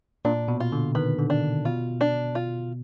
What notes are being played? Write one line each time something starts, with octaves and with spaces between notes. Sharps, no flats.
A#2 D4
B2
F4
D3
D#3 B4
D3
D4
B2 F4
D4
F4